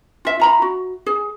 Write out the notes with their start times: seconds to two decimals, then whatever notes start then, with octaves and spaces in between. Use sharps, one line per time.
0.25 F4 E5
0.40 F4 A#5 B5
0.62 F#4
1.06 G#4